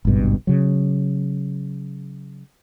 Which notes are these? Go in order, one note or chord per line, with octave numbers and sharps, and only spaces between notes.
G#1 C#2 G2 B2
C#3 F#3